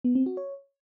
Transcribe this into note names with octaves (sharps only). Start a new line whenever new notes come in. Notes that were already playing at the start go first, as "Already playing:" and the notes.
B3
C4
F#4
C#5